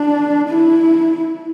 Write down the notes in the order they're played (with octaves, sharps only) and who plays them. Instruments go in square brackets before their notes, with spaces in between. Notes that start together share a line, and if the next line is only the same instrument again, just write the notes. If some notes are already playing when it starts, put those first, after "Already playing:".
Already playing: [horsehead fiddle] D4
E4